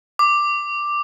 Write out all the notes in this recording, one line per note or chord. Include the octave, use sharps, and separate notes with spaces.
D6